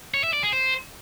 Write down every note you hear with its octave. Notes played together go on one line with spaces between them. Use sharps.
C#5
E5
D5
G#4
C5